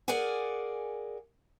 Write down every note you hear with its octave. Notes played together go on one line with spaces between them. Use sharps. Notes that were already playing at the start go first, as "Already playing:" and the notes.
G#4 A#4 D5 F5 F#5 G#5